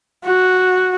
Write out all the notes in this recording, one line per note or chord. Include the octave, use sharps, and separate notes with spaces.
F#4